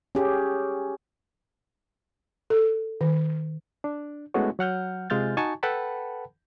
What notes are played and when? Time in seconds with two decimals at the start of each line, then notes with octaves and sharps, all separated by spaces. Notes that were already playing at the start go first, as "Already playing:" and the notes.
0.15 C#4 G4 G#4
2.50 A4
3.01 D#3
3.84 D4
4.34 G#3 A3 B3 C#4 E4 F#4
4.59 F#3 F#5 F6 G6
5.10 C3 G#3 F4 F6 G6 A6
5.37 D#4 F#4 G#5 A5 C#6
5.63 A4 B4 F#5 G5 A5 B5